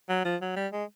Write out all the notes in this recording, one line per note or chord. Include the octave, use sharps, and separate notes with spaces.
F#3
F3
F#3
G3
G#3